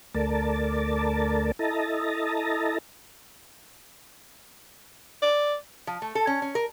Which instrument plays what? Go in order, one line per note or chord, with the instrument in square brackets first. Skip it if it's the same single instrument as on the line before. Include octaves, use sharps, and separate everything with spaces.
[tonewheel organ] D2 A3 A#4 D5 A5
E4 A4 D#5 A5 A#5
[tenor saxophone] D5
[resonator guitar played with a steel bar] F3
A3
A4
C#4
C#4
A#4